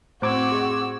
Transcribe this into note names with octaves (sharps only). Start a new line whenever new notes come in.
A2 C4 F#4 C5 A#5 D6 E6 G#6
G#4 D#5